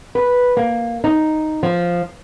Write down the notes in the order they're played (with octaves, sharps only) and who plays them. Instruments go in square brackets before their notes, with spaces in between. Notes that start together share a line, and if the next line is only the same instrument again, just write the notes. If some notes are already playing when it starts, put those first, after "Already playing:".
[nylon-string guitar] B4
A#3
D#4
F3